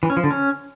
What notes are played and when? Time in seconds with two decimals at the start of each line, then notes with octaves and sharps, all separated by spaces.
0.03 E3
0.10 C#4
0.17 F3
0.24 D3
0.31 C#4